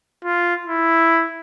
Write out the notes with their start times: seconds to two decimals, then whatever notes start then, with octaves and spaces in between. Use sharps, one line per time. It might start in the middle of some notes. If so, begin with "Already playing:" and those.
0.25 F4
0.67 E4